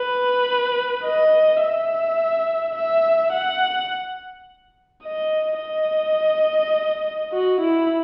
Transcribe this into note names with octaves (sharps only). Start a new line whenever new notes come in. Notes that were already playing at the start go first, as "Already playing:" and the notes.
Already playing: B4
D#5
E5
E5
F#5
D#5
D#5
F#4
E4